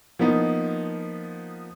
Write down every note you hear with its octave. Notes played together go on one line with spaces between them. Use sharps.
F3 A#3 B3 D#4